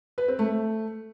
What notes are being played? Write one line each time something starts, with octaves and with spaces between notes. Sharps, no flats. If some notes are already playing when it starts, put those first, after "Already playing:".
B4
C4
A3